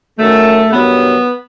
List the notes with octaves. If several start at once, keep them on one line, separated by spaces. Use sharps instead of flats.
F#2 D#3 F#3 A3
G2 D#3 F#3 B3